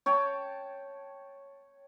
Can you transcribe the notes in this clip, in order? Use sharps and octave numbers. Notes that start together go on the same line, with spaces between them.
C#5 G5 A5